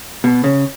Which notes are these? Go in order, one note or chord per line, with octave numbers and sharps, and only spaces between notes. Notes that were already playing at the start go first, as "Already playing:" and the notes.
B2
C#3